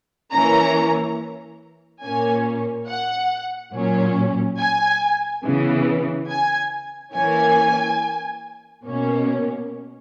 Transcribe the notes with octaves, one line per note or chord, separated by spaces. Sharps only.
E3 A#3 C#4 A#5
A#2 A#3 C#4 G#5
F#5
A#2 F#3 C#4
G#5
C#3 E3 B3
G#5
E3 A#3 C#4 G#5
B2 A#3 C#4